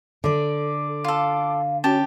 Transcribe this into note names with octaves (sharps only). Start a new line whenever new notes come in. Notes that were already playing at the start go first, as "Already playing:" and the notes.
D3 A4 D5 D6
F4 A4 F5
C#4 F#4 G4 A5